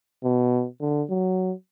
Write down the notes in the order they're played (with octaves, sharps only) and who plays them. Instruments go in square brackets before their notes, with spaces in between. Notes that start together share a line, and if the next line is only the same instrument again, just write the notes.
[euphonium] B2
D3
F#3